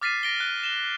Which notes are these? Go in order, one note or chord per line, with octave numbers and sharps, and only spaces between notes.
D6 F6 A6 B6 C7 D#7
A#6 D7 G7
F#6
E7 G7